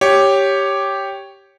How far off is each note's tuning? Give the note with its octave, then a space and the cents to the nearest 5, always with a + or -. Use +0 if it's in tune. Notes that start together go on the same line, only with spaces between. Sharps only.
G4 +0 C#5 +0